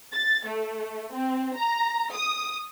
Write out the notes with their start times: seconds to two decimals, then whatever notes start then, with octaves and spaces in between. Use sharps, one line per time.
0.13 A6
0.47 A3
1.13 C4
1.56 A#5
2.14 D#6